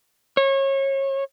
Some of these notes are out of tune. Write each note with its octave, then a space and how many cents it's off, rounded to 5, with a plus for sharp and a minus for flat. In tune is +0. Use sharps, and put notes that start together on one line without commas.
C#5 -30